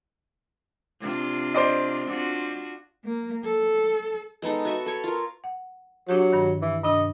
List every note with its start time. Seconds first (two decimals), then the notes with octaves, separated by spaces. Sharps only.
1.00 C3 D4 F4
1.54 C5 D5 D#5
2.07 D4 F4 F#4
3.04 A#3
3.44 A4
4.42 G#3 B3 D#4 A4
4.65 F#4 B4 E5 C#6
4.86 A4 C#5
5.04 F4 A#4
5.44 F#5
6.09 F#3 D4 G4
6.32 G2 D#3
6.62 E3
6.84 G2 C3 D4 D#5